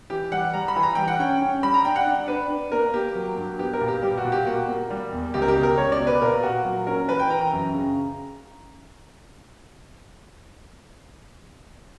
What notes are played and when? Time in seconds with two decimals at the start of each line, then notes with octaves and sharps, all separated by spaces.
0.10 E3 G4
0.32 G3 F#5
0.53 G3 A#5
0.68 B5
0.76 E3
0.83 A#5
0.95 G3 G5
1.08 F#5
1.19 C#4 G5
1.41 C#4
1.63 G3 B5
1.74 A#5
1.85 D4 G5
1.96 F#5
2.07 D4
2.28 D4 B4
2.50 D4
2.72 A#3 A#4
2.94 A#3 G4
3.15 F#3
3.37 G2
3.59 B3 G4
3.73 A#4
3.81 A#2
3.88 G4
4.02 G3 G4
4.18 F#4
4.24 A#2
4.32 G4
4.46 A#3 F#4
4.68 A#3
4.90 G3
5.12 E2
5.34 C#2 G4
5.42 A#4
5.48 G4
5.56 B2
5.63 A#4
5.77 C#2 C#5
5.92 D5
5.99 B2
6.07 B4
6.21 A#2 A#4
6.43 A#2 F#4
6.65 F#3
6.87 C#4 A#4
7.08 E3 B4
7.19 G5
7.30 E3 A#5
7.41 A#5
7.53 F#2
7.74 C#3